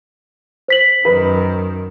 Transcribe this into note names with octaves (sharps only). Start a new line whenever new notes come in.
C5 B6 F#7
F#2 D#3 B4